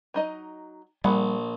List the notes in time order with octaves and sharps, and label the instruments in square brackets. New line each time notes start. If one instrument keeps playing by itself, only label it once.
[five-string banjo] F#3 D#4 D#5
[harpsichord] A#1 [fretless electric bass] G3 [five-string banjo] G#4 F#5 B5